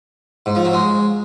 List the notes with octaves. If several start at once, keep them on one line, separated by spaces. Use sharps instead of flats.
G#2
F3
F#3
G#3